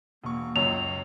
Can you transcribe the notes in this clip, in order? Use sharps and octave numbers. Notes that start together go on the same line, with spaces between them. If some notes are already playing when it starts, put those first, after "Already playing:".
E1 A#3 C#6
C#2 F#2 C#5 F7